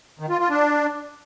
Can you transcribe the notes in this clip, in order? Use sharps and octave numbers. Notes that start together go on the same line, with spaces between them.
D#3
F4
F4
D4